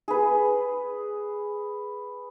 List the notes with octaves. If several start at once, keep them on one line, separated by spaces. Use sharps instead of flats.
G#4 B4